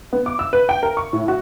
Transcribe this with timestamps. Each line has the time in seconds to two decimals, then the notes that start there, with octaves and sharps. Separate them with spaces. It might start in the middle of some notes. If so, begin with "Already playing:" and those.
0.13 B3
0.26 D6
0.39 E6
0.53 B4
0.69 G5
0.83 A#4
0.97 C#6
1.13 A2
1.28 F#4